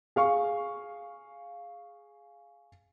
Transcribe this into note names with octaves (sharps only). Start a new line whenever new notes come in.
G#4 F5 C#6